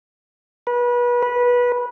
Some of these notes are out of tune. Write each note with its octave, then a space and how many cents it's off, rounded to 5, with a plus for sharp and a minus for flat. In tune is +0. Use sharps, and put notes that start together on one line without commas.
B4 -30
B4 -20